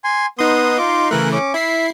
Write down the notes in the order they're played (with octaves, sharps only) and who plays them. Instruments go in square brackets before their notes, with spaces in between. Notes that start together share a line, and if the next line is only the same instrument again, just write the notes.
[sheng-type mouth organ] G#5 C6
[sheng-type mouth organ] B3 D#6 [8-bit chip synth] D#4 C6
[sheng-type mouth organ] F4 D6
[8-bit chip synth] C#3 E3 A3 [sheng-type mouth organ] A#4 F#6
[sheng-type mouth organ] C#4 D6
[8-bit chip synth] E4 C7 [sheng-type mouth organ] E5